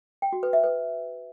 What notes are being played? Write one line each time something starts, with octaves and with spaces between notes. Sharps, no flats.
G5
F#4
B4
E5
B4